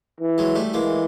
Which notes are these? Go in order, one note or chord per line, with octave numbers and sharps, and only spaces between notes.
E3
F#3 G#3
G3 A3
E3 G#3 A#3